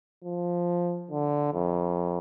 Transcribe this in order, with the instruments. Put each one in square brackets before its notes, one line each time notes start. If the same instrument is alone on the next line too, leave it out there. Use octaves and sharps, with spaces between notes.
[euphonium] F3
D3
F2